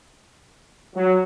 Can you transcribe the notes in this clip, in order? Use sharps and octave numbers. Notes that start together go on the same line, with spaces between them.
F#3